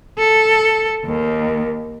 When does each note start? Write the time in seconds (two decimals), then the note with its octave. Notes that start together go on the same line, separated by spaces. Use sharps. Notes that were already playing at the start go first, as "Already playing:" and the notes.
0.19 A4
1.05 D#2